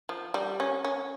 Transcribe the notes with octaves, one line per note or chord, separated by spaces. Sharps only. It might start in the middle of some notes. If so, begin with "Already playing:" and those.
F3
G3
C#4
C#4